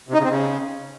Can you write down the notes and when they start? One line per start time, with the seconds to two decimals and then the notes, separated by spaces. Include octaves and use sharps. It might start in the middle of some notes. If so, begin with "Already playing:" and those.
0.08 C3
0.14 D#4
0.19 C#3
0.24 C4
0.29 C#3